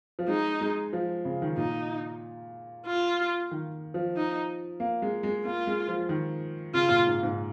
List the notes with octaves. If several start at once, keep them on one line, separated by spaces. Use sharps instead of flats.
F3
G#3 D#4
G#3
F3
C#3
D#3
A#2 D#4
F4
D#3
F3
D#4
A#3
G#3
G#3
A#3 F4
G#3
F3
D#3
C#3 F4
A#2
G#2
G#2